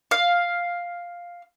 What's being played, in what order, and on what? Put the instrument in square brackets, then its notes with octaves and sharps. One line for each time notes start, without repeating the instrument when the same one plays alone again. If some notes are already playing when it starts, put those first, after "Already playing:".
[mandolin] F5